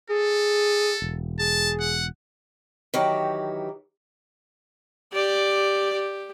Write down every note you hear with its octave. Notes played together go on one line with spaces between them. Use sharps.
G#4 A4
E1
G#4 A5
F#5
D#3 E3 F#3 G4
G4 D5
G4